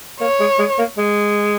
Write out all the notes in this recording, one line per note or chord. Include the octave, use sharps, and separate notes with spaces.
A#3 C#5
G#3
G#3
A#3
G#3